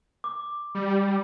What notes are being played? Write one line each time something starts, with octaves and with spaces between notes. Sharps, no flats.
D6
G3